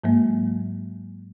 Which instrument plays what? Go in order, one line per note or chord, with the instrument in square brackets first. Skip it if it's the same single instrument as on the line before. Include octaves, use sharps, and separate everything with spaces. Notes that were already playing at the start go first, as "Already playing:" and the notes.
[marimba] G#2 F#3 G#3 A#3